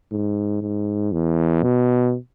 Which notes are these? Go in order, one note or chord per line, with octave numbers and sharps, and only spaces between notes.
G#2
G#2
E2
B2